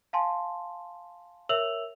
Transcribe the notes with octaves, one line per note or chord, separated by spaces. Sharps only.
F5 G#5 A5 C6
A#4 C#5 E5 E6 F7 F#7